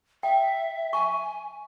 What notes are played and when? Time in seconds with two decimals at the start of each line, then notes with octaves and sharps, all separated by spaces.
0.23 E5 G5
0.93 G#5 C#6